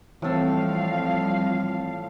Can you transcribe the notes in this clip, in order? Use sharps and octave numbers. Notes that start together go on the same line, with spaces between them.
A2 E3 F3 G3 C4 A4 F5